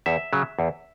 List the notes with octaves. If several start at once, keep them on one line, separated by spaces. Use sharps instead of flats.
E2 E5
C#3 F#3
E2